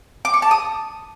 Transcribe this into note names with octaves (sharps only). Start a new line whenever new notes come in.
D6
C#6
A5
D#6